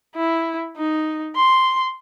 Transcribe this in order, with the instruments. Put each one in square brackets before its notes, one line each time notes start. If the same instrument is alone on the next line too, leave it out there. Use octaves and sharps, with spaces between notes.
[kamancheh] E4
D#4
C6